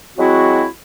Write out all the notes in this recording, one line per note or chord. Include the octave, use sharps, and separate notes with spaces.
F#3 G#3 C4 E4 F#4